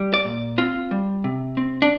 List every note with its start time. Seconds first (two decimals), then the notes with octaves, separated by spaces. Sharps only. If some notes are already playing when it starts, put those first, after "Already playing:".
Already playing: G3
0.14 D5
0.25 A#2
0.58 C4 F4
0.91 G3
1.24 C3
1.57 C4
1.82 D4